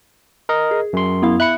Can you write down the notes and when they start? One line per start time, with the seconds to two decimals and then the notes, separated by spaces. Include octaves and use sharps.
0.49 A#4 D#5
0.71 G#4
0.93 F#2 C6
1.22 B3 E4 F5
1.40 E5 B5 F#6 C#7